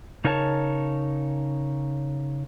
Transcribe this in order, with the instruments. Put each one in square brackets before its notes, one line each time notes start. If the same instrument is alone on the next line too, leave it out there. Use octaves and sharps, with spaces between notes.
[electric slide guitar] C#3 D#4 A#4 C#5 G#5 A5